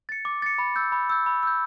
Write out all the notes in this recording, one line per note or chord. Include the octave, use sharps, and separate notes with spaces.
A6 C#7
D6
A6 C#7
B5
E6 G6
B5
E6 G6
B5
E6 G6